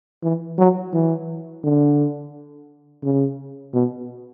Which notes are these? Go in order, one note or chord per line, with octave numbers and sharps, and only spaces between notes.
E3
F#3
E3
D3
C#3
B2